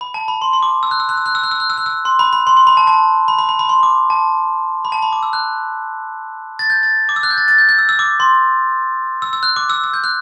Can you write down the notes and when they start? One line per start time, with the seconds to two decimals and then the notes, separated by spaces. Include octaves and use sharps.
0.01 B5
0.14 A5
0.28 B5
0.42 C6
0.53 C6
0.63 D6
0.83 E6
0.91 F#6
1.00 E6
1.09 F#6
1.17 E6
1.26 F#6
1.35 E6
1.44 F#6
1.51 E6
1.60 F#6
1.70 E6
1.78 F#6
1.86 E6
2.05 C6
2.19 B5
2.33 B5
2.47 C6
2.57 C6
2.67 B5
2.77 A5
2.87 A5
3.28 B5
3.39 B5
3.49 B5
3.59 B5
3.69 C6
3.83 D6
4.10 A5
4.85 B5
4.92 A5
5.02 B5
5.13 D6
5.23 E6
5.33 F#6
6.59 A6
6.70 G6
6.83 A6
7.09 D6
7.16 E6
7.23 F#6
7.31 G6
7.38 A6
7.48 A6
7.58 G6
7.69 G6
7.79 E6
7.89 E6
7.99 D6
8.20 C6
9.22 E6
9.33 E6
9.43 F#6
9.56 D6
9.70 E6
9.84 E6
9.94 G6
10.04 F#6